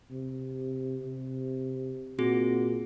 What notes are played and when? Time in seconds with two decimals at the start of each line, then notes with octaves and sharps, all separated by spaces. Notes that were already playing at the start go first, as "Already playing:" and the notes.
0.11 C3
1.06 C3
2.19 A#2 C4 F#4 G#4